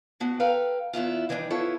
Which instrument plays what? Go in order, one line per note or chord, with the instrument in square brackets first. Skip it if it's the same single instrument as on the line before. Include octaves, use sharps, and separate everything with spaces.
[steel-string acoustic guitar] B3 D4 F#4
A4 B4 F5 G5 A#5
E2 B3 E4 F4
D#3 E3 G3 A#3 D4
B3 E4 F4 A4 C#5